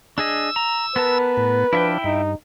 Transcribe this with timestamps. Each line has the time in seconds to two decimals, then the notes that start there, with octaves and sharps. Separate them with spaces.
0.18 D4 G#4 D#5 E6
0.56 A#5
0.96 B3 A#4 B4 A5
1.37 A2
1.73 F3 D4 E4 E5 G5
2.04 G2 D#4